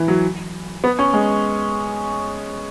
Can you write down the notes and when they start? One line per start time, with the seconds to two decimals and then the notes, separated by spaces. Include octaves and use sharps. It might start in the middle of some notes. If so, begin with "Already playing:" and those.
Already playing: E3
0.08 F#3
0.84 B3
0.99 C#4
1.14 G#3